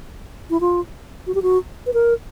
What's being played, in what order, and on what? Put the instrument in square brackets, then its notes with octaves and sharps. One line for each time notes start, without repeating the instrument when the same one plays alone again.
[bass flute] E4
F4
F#4
G4
F#4
B4
A#4